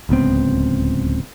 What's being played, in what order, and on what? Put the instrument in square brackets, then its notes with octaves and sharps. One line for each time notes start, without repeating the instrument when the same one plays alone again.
[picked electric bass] D1 C#2 B3 C4